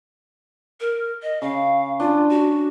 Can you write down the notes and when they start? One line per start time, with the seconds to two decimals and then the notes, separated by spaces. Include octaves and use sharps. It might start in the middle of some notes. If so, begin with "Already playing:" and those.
0.81 A#4
1.23 D#5
1.42 C#3 F5
2.00 D4 F4
2.29 F#4